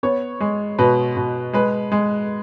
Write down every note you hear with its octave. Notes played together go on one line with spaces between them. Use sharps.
B3 C#5
G#3
B2 B4
B2
G#3 B4
G#3